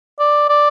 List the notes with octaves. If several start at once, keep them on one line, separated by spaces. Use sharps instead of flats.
D5
D5